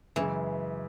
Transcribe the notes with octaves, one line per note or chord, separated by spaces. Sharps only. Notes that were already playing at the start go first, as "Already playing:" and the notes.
F#2 C#3 E3 G#3